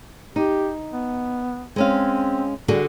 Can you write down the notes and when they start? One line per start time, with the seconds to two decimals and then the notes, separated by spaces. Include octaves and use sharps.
0.36 D#4 G4
0.92 B3
1.76 G#3 C4 C#4 F5
2.68 D3 G3 F#4 G#4